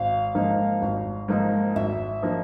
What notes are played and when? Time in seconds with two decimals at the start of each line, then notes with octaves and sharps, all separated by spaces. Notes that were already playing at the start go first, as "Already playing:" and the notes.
Already playing: G#1 F5
0.35 G#2 F3 A#3 D#4
0.82 G#1
1.28 G#2 F3 A#3 D#4
1.75 G#1 E5
2.23 F3 A#3 D#4